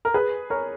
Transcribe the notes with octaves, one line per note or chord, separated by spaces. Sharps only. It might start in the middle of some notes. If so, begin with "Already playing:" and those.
A#4
G#4 B4
A#4 C#5